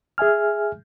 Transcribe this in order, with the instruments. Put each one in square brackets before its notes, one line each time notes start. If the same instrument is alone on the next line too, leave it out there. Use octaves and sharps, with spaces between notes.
[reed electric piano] G#4 E5 G#5 F6